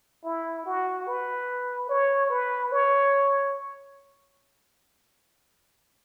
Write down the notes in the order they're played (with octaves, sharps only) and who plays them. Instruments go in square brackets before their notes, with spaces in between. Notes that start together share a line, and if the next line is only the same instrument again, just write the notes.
[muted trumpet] E4
F#4
B4
C#5
B4
C#5